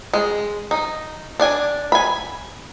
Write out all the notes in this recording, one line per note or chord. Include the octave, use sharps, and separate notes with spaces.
G#3
D#4
D4 D5 G#5
G#5 B5